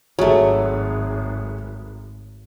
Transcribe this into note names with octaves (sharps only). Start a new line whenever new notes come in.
G#1 F#3 A3 G#4 C#5